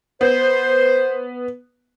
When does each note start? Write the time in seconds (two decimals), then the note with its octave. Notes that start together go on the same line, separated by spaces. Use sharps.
0.21 B3 C5